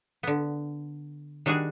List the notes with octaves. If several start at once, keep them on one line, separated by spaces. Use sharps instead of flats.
D3 B3
D#3 G3 D4 F#4 G#4